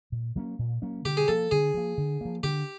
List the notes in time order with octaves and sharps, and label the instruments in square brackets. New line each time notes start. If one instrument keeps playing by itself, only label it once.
[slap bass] A#2
F#3 A#3 C#4
A#2
F#3 A#3 C#4
[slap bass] D3 [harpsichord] G4
[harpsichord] G#4
[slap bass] F3 A#3 [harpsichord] A4
[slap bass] D3 [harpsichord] G#4
[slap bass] F3 A#3
D3
F3 A#3
[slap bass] D3 [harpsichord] G4